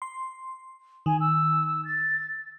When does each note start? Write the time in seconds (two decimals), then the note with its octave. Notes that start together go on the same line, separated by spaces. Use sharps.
0.02 C6
1.06 D#3 G#5
1.20 E6
1.84 A6